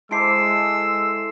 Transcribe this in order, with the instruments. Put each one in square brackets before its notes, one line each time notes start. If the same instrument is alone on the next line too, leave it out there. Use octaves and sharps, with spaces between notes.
[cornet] G#3 [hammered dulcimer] E4 A4 C5 [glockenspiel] D6 C7 D7 [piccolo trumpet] E6